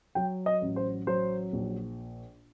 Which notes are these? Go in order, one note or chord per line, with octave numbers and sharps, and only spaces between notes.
F#3 G5
D#5
A1
C5
F#3 C5
A#1